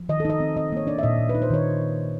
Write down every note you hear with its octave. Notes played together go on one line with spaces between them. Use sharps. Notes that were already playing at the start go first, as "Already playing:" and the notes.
Already playing: F3
D#3 D#5
A4
D#4 D#5
C4
C4 D#5
A#3 C#5
D4 D5
E5
A#2 D#5
A#2
B4
D#4
C5
D#3 C#5